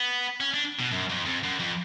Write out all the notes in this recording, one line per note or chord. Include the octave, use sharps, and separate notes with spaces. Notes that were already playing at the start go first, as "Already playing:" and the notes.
Already playing: B3
C#4
D4
B2
F#2
F2
F2
F#2
F2